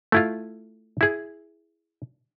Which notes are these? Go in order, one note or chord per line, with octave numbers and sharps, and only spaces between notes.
A3 E4 F4
E4 G#4